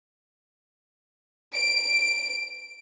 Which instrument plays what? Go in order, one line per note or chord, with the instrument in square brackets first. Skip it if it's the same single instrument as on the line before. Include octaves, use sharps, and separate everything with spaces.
[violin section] D7